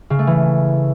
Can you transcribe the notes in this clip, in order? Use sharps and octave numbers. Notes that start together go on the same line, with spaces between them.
C#3
A3
E3